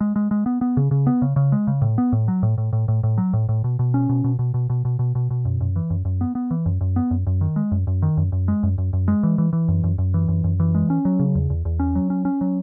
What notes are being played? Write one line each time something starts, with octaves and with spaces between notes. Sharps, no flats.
G#3
G#3
G#3
B3
B3
C#3
C#3
B3
C#3
C#3
G#3
C#3
A2
B3
A2
F#3
A2
A2
A2
A2
A2
F#3
A2
A2
B2
B2
C#4
B2
B2
B2
B2
B2
B2
B2
B2
B2
F#2
F#2
E3
F#2
F#2
B3
B3
E3
F#2
F#2
B3
F#2
F#2
D#3
G#3
F#2
F#2
D#3
F#2
F#2
G#3
F#2
F#2
F#2
G#3
E3
E3
E3
F#2
F#2
F#2
E3
F#2
F#2
E3
G#3
C#4
F#3
C#3
E2
E2
E2
C#4
F#3
C#4
C#4
F#3